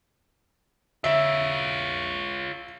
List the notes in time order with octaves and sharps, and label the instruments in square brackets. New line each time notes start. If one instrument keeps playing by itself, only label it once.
[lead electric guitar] F4 C#5 [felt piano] E5